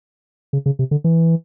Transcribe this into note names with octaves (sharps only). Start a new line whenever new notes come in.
C#3
C#3
C3
D3
E3